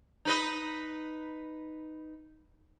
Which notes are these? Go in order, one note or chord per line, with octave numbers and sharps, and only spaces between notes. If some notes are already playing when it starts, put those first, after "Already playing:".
D#4 B4 D#5